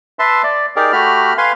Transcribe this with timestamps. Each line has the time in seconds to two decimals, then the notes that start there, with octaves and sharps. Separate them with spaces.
0.19 B4 E5 A5 C6
0.43 D5
0.76 D#4 G4 G#4 A#4 D5
0.92 A3 F#4 G4 B5 F6
1.38 B4 F5 G#5 C6